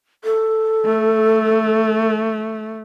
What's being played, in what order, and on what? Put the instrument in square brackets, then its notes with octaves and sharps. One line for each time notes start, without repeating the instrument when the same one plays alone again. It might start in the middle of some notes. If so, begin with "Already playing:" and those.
[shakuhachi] A4
[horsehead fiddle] A3